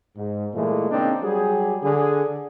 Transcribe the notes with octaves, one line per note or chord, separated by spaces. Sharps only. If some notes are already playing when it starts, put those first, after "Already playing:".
G#2
A#2 E3 G#3 A3
C#3 A#3 C4 D4 D#4
F#3 G3 G4 G#4
D3 G#4